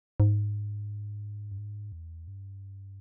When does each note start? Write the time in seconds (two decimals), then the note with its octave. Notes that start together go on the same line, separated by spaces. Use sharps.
0.20 G#2
1.52 G2
1.58 G#2
1.92 E2
2.28 G2